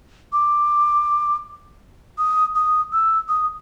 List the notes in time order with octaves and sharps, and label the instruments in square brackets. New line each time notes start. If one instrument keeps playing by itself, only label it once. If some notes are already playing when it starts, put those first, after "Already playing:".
[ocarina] D6
D#6
D#6
E6
D#6